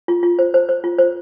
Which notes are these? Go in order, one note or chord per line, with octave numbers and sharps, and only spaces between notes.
F4
F4
C5
C5
C5
F4
C5